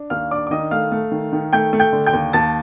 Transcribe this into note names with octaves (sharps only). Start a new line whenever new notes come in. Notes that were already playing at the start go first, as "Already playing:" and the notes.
Already playing: D4
D#2 F5 F6
D4 D5 D6
D6
D#3 D#5 D#6
A3 F5 F6
A3
D#3
D#3
A3 G5 G6
A3
G5 G6
D3
G5 G6
D#2
D#2 A5 A6